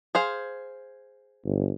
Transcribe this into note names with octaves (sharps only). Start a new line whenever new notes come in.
G#4 C5 F5
G1